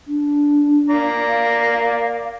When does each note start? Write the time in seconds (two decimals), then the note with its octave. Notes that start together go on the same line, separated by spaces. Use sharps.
0.07 D4
0.90 A#3 D5 A#5
1.28 F5